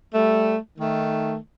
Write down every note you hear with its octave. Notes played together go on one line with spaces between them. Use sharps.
G3 A3
D#3 A3